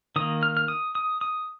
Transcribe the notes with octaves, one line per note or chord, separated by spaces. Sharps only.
D#3 A#3 D#6
F6
F6
D#6
D#6
D#6